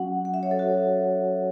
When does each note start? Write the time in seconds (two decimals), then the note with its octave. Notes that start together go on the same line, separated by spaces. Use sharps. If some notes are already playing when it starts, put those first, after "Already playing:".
Already playing: F#3 C#4 F#4 F#5
0.25 F#5
0.34 E5
0.43 C#5
0.51 A4
0.59 F#4